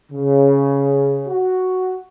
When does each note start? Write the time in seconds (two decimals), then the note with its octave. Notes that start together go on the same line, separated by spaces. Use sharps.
0.12 C#3
1.28 F#4